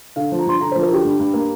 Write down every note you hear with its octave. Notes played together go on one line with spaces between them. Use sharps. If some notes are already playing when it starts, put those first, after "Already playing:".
D3 F5
F3
A#5
G2 C6
D3 A#5
F3 C5
A#4
D3 G4
G2
G2
A#3